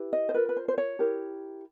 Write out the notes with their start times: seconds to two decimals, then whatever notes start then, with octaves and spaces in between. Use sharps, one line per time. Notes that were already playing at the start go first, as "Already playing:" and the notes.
Already playing: E4 G4 B4
0.13 D#5
0.29 C5
0.34 F4 A#4 B4
0.49 B4
0.56 C5
0.68 C5
0.78 C#5
0.99 E4 G4 A#4